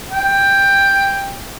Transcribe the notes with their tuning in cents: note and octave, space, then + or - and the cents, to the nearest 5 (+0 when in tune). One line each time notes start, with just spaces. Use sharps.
G5 +10